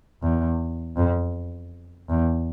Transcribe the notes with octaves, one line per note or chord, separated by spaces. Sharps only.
E2
F2
E2